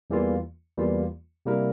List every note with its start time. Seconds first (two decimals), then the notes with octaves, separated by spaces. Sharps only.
0.10 E2 E3 G3 A#3 F4
0.77 E2 E3 G3 A#3 F4
1.46 C3 G3 A#3 E4 A#4